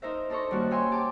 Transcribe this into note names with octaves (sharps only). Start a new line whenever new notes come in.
D#4 A#4 C5 E5
D4 D#4 A4 C5 A#5 C#6
G2 D#3 G3 A#3 C#4 F#4
C#5 E5 G5 G#5 C6 C#6
G4 G5 A5 D6